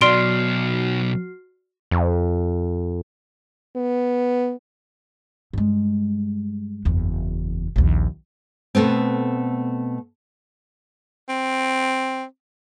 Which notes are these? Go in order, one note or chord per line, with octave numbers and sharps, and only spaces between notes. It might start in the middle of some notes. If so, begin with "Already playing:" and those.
B2 F#3 F#4 D5 C6 F6 C7 D7
F2
B3
G2 G#3
F#1 E2
A#1 D#2
B2 A3 B3 C4
C4